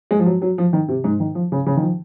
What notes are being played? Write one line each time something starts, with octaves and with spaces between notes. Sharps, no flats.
G#3
F3
F#3
F#3
F3
D#3
C3
G#2
D#3
F3
C#3
C#3
D#3
F3